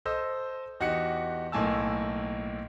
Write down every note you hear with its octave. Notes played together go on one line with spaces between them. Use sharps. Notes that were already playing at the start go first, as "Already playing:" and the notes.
A4 C5 D#5 E6
E2 D#4 F#4 G4 F#6 C#7
B1 A2 A#3 G#5 A5 E6